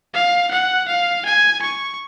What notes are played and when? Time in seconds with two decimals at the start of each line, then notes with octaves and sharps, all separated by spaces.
0.14 F5
0.51 F#5
0.88 F5
1.25 G#5
1.62 C#6